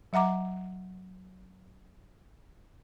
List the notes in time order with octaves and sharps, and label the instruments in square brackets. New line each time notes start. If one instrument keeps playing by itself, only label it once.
[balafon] F#3 E5 F#5 A#5 D6